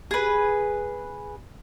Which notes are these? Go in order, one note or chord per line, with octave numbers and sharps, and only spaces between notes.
G#4 B4